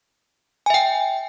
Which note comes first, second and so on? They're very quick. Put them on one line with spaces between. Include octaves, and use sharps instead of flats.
G#5 E5 G5